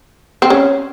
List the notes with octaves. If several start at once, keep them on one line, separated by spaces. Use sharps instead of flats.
C4
C#4